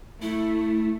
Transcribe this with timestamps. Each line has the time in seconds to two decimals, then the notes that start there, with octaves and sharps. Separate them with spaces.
0.22 A3 E4